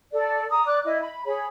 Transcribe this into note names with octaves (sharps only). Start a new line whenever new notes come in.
A4 D5
A#5 D#6
D5 D6 F#6
E4 D#5
B5
G#4 C#5 B5